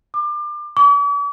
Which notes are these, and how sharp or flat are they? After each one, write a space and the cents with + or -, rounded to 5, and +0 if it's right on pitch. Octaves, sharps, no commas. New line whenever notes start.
D6 +30
D6 -45